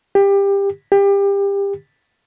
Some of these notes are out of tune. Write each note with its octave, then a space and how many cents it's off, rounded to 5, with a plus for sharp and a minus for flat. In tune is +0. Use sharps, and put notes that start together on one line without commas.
G4 +20
G4 +25